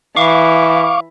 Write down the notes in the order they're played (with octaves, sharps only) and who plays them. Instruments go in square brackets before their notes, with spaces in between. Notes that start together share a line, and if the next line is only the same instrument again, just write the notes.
[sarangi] E3 [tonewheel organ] F5 C#6 D6